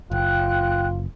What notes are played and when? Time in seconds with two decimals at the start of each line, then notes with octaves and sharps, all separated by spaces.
0.11 F#1 F4 G5 F#6